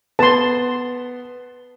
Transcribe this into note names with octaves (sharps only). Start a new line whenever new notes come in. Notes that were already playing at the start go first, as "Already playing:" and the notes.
B3 A5 C6